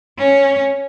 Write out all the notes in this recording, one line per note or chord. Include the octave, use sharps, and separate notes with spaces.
C#4